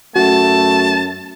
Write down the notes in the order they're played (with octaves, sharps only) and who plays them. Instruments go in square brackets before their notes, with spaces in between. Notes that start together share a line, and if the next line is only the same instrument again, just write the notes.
[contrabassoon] F#2 [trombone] A3 [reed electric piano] F#4 [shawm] A5